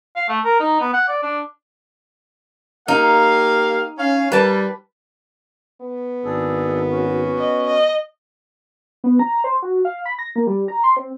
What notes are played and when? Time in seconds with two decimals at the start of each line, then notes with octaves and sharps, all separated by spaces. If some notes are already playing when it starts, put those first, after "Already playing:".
0.16 F5
0.29 A3
0.45 A#4
0.60 D#4
0.80 B3
0.93 F#5
1.09 D5
1.23 D4
2.88 A#3 D#4 G4 F5
3.98 C#4 F5
4.32 G3 B4 A5
5.81 B3
6.25 G#1 D4 G#4 A4
6.91 C#4 F#4
7.38 D#5
7.67 D#5
9.04 B3
9.19 A#5
9.44 C5
9.62 F#4
9.85 F5
10.05 B5
10.19 A#6
10.36 A#3
10.47 G3
10.68 A#5
10.84 C6
10.96 C4